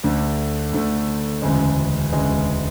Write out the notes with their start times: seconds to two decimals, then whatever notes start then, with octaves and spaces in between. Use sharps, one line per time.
0.04 D2 D3 A3
0.73 D2 D3 A3
1.42 E1 D2 C#3 G#3
2.12 E1 D2 C#3 G#3